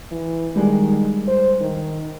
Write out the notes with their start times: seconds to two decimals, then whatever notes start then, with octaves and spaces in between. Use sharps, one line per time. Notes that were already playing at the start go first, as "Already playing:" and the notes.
0.11 E3
0.55 D#3 G3 G#3
1.28 C5
1.60 D#3